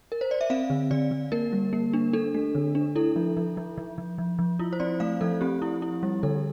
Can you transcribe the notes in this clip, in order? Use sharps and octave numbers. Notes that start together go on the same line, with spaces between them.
A#4
C5
D5
E5
C4 F5
D3
D3 D5
D3
A#3 A#4
G3
A#3
D4
D4 A4
A3
D3
D4
E4 A4
F3
F3
F3
F3
F3
F3
F3
E4 F4
C5
C4 D5
A3 F5
F3 A4
C4 G4
E4
E4
G3
D3 A4